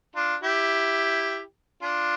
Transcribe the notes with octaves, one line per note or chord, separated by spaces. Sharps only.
D4 F4
E4 G4
D4 F4